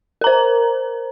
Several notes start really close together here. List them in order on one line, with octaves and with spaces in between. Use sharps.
A#4 A#5 C5